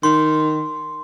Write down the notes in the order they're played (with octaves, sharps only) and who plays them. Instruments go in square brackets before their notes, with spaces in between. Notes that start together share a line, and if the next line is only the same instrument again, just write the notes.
[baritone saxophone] D#3 [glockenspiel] C6